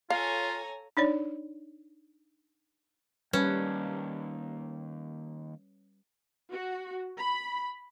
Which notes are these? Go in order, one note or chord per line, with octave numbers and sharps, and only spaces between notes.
F4 A4 C#5 F5 G#5 A#5
D4 D#4 C#5 D5
D#3 G3 A#3 C#4 B4 A5
F#4
B5